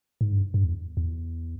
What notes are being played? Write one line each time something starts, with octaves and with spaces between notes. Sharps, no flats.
G#2
G2
G2
E2
E2